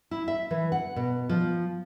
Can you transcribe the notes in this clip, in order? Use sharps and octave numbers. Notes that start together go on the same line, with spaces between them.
E4
E5
E3
F#5
B2
F3